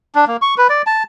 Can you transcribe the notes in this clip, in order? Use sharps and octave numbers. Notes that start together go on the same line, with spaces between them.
D4
A#3
C#6
B4
D5
A5